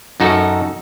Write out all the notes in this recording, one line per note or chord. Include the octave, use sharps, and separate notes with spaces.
F#2 D#4 F#4 A4